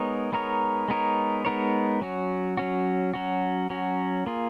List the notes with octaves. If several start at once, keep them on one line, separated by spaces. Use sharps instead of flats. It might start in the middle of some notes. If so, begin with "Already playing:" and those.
Already playing: G#3 B3 D#4 A#4 C#5
G#3 B3 D#4 A#4 C#5
G#3 B3 D#4 A#4 C#5
G#3 B3 D#4 A#4 C#5
F#3 C#4 F#4
F#3 C#4 F#4
F#3 C#4 F#4
F#3 C#4 F#4
A#3 F4 G#4